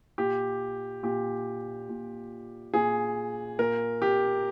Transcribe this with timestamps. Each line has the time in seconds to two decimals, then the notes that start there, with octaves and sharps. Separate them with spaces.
0.18 A#2 G4
1.03 A#2 G4
1.89 A#2
2.74 A#2 G#4
3.59 A#2 A#4
4.02 G4